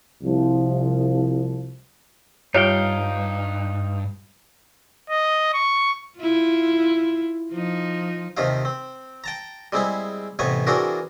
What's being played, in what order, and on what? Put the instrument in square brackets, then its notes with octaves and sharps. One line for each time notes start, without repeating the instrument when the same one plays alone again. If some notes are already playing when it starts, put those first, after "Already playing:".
[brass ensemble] C2 F3
[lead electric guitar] G2 [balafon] G3 F4 G4 [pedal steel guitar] D#4 F5 G5 [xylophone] C#5
[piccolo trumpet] D#5
C#6
[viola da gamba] E4 F4
F3 D#4
[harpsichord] D#2 C3 F3 D#4 F5
C4
G5 A5 A#5
G3 G#3 C4 E4 G#4
A1 C3 B3 C#5 G#5
E3 C4 D4 F#4 G#4 A#4